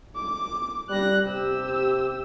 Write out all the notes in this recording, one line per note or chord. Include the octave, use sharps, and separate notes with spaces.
D6
G3 F#6 A#6
C3 G4 E6